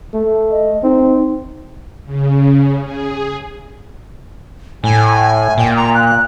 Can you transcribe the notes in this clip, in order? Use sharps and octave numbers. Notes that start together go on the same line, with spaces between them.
A3
D#5
C4 D#4
C#3
G#4
A2 G#5
A#2 G5
A#5
F#6